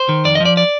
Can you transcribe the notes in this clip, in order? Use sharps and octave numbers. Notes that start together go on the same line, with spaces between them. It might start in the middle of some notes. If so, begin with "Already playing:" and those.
Already playing: C5
D#3
F2 D5
D#5
F3
D5
D5